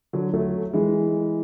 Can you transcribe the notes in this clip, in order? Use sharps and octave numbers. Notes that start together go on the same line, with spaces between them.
D3 F#3
F#3 A3
E3 G#3